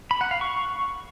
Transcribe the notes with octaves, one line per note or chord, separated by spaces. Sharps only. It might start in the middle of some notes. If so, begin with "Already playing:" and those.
B5
F#5
F5
C#6